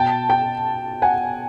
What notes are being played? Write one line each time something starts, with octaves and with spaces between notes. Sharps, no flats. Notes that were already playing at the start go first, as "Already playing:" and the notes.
Already playing: B2 G5 A5
G5 A5
F#5 G#5